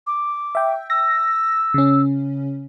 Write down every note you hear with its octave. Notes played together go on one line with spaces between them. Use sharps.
D6
E5 G5
E6 A#6
C#3 C#4